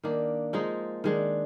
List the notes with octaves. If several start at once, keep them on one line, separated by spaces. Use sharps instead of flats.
D#3 A#3 D4
F3 G#3 D#4
D#3 G#3 D4